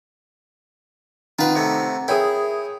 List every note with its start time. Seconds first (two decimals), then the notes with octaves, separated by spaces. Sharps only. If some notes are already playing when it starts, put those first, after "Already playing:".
1.39 D#3 C4 F4 B4 F#5 A#5
1.55 C3 A3
2.08 E4 G#4 A#4 C#5 E5 G5 D#6